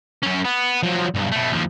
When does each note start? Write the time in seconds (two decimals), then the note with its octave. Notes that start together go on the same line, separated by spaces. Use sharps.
0.23 F#2 C#4
0.44 B3
0.83 F3 F#3
1.15 B1 G2
1.32 B2 A3
1.52 D#2 F3